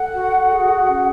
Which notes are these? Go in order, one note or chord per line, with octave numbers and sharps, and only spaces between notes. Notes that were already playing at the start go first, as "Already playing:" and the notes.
Already playing: A4 F#5
F#4
G#4
C#4